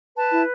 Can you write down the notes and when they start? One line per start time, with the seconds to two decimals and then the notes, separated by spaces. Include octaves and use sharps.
0.16 B4 A5
0.32 E4